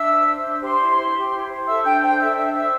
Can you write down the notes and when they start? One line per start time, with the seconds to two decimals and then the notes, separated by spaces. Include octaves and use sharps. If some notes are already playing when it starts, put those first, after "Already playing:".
Already playing: D4 E5 E6
0.10 C5
0.27 C5
0.44 D4
0.61 G4 C5 C6
0.79 E4
0.97 C5
1.15 G4
1.31 E4
1.49 C5
1.66 A4 E5 E6
1.84 D4 G5 G6
2.01 C5 G5 G6
2.19 A4 E5 E6
2.36 D4 E5 E6
2.53 C5 E5 E6